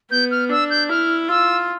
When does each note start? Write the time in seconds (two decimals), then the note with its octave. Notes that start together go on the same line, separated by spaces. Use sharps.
0.11 B3 G6
0.31 F6
0.50 D4 E6
0.70 G6
0.89 E4 F6
1.29 F4 E6